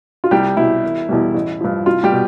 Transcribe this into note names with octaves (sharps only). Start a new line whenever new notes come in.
F4
C2 G3 G4
B2 G3 E4
E1
E2 B2 G3
A1
G2 F3
C2 F4
G3 G4
B2